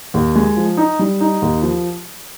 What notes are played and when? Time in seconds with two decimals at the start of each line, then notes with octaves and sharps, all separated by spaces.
0.14 D#2
0.35 G#3
0.57 F3
0.77 D#4
0.99 G3
1.20 D#4
1.42 D#2
1.62 F3